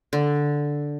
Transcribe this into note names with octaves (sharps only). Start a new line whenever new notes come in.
D3